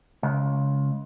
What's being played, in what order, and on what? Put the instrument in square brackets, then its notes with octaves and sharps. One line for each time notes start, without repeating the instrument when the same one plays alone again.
[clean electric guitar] C#2